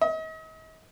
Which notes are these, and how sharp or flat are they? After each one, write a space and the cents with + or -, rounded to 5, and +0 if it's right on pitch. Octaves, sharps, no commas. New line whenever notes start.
D#5 +40